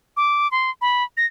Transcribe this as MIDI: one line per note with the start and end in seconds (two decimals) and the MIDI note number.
0.17 0.50 86
0.51 0.70 84
0.81 1.04 83
1.17 1.26 94